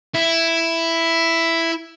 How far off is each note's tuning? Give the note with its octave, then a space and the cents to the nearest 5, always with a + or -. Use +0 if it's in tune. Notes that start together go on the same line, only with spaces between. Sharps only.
E4 +5